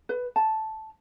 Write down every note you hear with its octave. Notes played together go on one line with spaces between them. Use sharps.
B4
A5